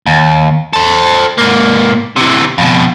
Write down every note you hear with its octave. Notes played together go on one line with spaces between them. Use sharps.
D#2
A4 C5
G#2 A#3
C3 E3
F2 B2